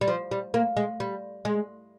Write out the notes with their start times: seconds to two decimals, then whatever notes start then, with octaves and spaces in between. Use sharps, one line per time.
0.01 G3
0.08 F3
0.31 G3
0.54 A#3
0.77 G#3
1.00 G3
1.45 G#3